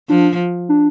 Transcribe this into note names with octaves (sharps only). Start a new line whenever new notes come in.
F3 D4
D4